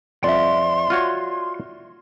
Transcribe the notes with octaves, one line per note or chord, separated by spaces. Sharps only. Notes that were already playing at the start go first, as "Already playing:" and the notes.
F2 D5 E5 C6
F4 F#4 C#5